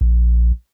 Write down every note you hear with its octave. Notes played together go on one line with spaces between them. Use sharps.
A#1